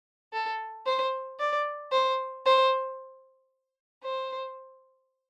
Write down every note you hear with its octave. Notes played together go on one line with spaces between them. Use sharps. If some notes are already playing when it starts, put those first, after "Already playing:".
A4
C5
D5
C5
C5
C5